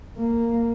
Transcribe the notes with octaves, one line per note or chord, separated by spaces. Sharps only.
A#3